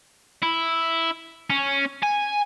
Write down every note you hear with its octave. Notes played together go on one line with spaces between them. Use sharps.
E4
C#4
G#5